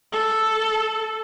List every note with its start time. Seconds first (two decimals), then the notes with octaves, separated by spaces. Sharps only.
0.12 A4